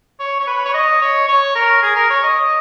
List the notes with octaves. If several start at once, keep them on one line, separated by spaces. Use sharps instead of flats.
C#5
C#5
B4
C#5
D#5
C#5
C#5
A#4
G#4
A#4
C#5
D#5